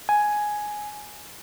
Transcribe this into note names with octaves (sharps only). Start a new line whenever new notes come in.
G#5